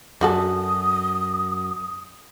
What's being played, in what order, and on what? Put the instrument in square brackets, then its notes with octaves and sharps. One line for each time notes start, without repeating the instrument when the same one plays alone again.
[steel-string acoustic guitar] F#2 [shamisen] D3 F#4 A4 [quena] D#6